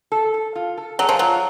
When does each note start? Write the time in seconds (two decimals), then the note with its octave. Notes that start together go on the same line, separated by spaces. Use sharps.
0.12 A4
0.34 A4
0.55 F4
0.77 A4
0.99 F#3 G#4
1.09 F3
1.19 F#3 F4